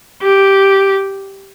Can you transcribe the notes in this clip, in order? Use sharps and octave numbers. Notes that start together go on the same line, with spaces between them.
G4